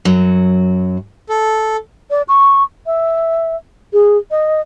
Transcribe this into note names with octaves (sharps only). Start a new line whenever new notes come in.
F#2 F#3
A4
D5
C#6
E5
G#4
D#5